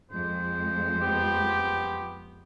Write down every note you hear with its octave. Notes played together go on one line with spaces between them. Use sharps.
F2 G#3 C5
B3 G4